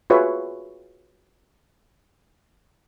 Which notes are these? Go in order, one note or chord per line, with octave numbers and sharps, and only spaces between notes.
F4 F#4 G#4 B4 C#5 E5